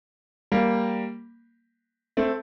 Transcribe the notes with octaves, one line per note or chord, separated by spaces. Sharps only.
G3 A#3
A3 C4